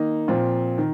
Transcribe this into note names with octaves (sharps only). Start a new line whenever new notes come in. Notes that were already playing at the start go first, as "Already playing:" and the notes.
Already playing: D#3 A#3 D#4
A#2 F3 C4 F4
D#3